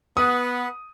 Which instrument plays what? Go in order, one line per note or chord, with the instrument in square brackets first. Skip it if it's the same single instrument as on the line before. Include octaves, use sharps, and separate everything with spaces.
[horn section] B3 [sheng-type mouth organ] B4 F#5 [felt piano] D#6